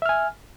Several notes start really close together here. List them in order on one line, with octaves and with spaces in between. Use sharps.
E5 F6 G#5